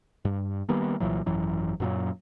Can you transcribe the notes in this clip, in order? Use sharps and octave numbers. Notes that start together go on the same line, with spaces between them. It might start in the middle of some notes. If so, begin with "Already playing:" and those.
G2
D#3 G3 A#3 B3
C2 A#2 E3 F#3
G#1 F#2 E3 F#3
F#2 A#2 F#3